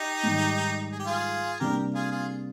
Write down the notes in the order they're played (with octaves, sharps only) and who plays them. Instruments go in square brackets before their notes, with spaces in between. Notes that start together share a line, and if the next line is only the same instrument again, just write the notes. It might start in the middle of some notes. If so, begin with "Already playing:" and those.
Already playing: [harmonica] D#4 G4
[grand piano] G#2 D#3 G3
[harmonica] G#4
G4
F4 G#4
[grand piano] C3 G3 A#3 D4 [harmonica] G4 A#4
[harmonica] F4 G#4
F4 G#4